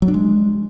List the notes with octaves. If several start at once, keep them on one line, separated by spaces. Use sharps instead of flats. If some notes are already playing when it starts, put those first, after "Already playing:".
F#3
D4
G#3